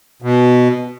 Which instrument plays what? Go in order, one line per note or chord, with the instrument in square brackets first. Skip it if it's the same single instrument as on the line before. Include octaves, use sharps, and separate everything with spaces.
[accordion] B2